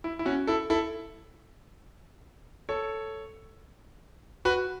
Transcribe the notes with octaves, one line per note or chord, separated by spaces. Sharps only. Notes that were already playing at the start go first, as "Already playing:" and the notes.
E4
E4
C#4 F#4
E4 A4
E4 A4
A4 C#5
F#4 B4